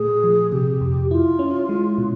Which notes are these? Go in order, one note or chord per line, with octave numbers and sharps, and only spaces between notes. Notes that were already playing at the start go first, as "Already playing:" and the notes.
Already playing: A#2 A3 G#4
F3
C3 G4
F2
E4 F4
C#4
G#3
B2